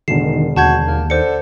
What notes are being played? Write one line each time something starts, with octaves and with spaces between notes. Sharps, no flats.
E1 D3 D#3 C7 E7
D#2 F#4 A5 G6 G#6
A#3
D3 C5 C#7